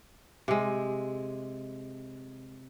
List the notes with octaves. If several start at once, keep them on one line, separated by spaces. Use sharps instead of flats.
C3 G#3